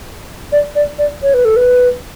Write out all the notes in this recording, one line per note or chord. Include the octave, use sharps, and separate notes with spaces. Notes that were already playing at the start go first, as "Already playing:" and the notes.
D5
D5
D5
C#5
B4
A4
B4